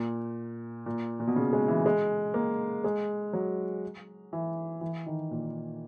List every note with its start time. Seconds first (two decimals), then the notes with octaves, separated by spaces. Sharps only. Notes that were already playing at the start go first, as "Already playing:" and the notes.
Already playing: A#2
0.86 A#2
1.20 A#2
1.27 B2
1.36 C#3
1.53 G#3
1.68 E3
1.86 G#3
2.34 A#3
2.84 G#3
3.33 F#3
4.33 E3
4.81 E3
5.06 D#3
5.31 A#2